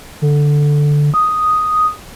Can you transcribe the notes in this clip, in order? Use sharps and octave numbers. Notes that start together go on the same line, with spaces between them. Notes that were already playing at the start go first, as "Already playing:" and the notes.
D3
D#6